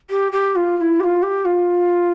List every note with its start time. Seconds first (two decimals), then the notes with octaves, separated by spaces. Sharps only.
0.10 G4
0.32 G4
0.56 F4
0.77 F4
0.81 E4
1.00 G4
1.03 F4
1.22 G4
1.45 F4